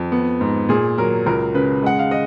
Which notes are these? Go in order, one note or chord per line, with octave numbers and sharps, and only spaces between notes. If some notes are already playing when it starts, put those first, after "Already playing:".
Already playing: F2
B3
G#2
A#2 G#4
F#3 A#4
C#2 A#4
C#3 B4
G#3 F#5
F5
D#5